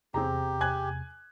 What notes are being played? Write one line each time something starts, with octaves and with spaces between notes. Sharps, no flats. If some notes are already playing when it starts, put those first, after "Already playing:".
E2 C3 C4 G4 G#4 A#5
G#5 F#6 G#6